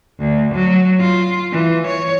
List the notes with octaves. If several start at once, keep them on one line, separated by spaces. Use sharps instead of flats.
D2
F#3
F4
E3
C#5